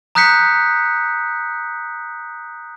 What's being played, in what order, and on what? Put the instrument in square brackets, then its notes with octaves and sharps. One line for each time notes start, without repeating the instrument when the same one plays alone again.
[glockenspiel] A#5 D#6 F#6 G6 B6 C#7